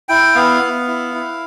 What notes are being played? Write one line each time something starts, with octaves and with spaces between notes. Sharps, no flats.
E4 G5
B3 F5
B3
E4
E4